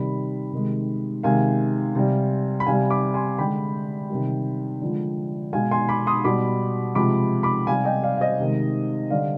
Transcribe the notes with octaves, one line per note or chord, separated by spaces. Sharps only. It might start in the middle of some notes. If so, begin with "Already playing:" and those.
Already playing: C3 D#3 G3 B5
C3 D#3 G#3
C3 D#3 G#3 F5 G#5
C3 G3
B5
C3 G3 F5 G#5
B5 D6
G#5 C6
D3 G#3 G5 B5
C3 D#3 G3
D3 F3 G#3
B2 G#3 F5 G#5
G#5 C6
B5 D6
C6 D#6
B2 G3 B5 D6
C3 F3 G#3 B5 D6
B5 D6
C3 G3 F5 G#5
D#5 G5
D5 F5
F5
C5 D#5
C3 D#3 G#3
D3 G3 D5 F5